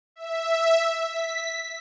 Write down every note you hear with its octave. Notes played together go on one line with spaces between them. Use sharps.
E5
B6